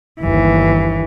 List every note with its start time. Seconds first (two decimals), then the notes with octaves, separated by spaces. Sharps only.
0.21 G1 D#2 E3